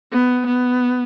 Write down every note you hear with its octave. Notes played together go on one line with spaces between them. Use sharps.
B3
B3